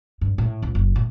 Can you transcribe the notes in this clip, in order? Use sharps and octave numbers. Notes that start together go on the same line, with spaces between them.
G2
A2
C#2
F#1
A2